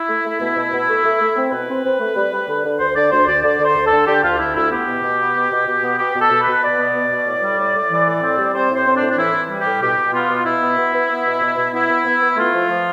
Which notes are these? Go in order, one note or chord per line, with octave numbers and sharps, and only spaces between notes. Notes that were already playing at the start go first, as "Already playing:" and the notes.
Already playing: E4
A3
A3
B2
B2
B2
A3
A3
A3
C4
B2 B4
C4
C4
A3
G3
G3
D3
D3
D2 C5
D3 D5
D2 C5
D2 D5
D3 D5
D3
C5
D2
A4
D3
D3 G4
D2 F4
D2 E4
D2 E4
B3 G4
B2
B2
B3
B2
B2
B2
B3
B2 G4
B2
A4
B2
B4
B2
B2 D5
B3
B2
B2
A2
G3
A2
A2
E3
A2
C4
G3
C4 C5
A2
C5
C4
D4
A2
D4
E3 E4
E3
G3
G4
A2
B2 G4
B2
B3 F4
B2
B2 E4
B3
B3
B3
B3
B2
B2
B2
B3 E4
B3
B3
B3
A3 F4
F3
F3